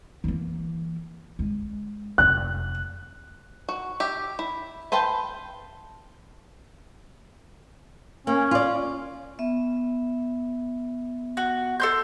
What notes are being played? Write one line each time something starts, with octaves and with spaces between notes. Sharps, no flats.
E3 A#3
G#3
F1 D#4 F#6
F#4
G4 E5
E4
B4 C5 F5 G5 A5
A#3 C#4
F4 D5
B3 E5
F#4
A4 C6 G6